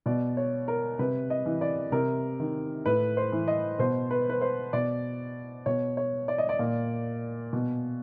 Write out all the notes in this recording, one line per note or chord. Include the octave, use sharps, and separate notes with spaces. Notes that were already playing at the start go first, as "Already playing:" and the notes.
B2 D5
C#5
A#4
C3 B4
D#5
E3
D5
C3 A#4
D#3
A2 B4
C5
E3
D#5
B2 C5
B4
B4
C5
B2 D5
B2 C#5
C#5
D5
D#5
D5
A#2
B2